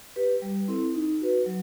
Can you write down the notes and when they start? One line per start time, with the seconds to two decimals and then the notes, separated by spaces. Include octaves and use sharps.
0.16 G4 B4
0.42 G3
0.68 C4 E4 A4
0.94 D#4
1.21 F#4 B4
1.46 F#3